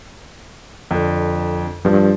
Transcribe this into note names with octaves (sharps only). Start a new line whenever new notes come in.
F2 D3
G2 F3